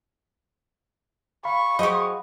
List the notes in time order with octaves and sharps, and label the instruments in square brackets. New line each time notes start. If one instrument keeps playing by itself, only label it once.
[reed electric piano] F5 B5 [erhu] C#6
[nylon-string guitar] F#3 G#4 C5 [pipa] G4 D#5